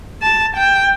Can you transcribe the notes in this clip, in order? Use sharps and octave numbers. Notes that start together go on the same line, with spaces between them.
A5
G5